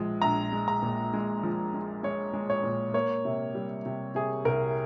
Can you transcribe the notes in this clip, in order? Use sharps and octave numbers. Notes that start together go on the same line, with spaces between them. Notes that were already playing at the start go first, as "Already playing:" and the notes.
Already playing: A#1 F3 G#3
A#1 A#5
G#3
A#5
A#2
G#3
F3
G#3
G#3 C#5
G#3
C#5
A#2
A#3 C#5
C3
G3
C3
C3 G#4
C2 A#4